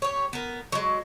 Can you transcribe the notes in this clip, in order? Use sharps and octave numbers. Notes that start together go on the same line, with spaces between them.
G4 C#5
B3 A#4
F#3 G#3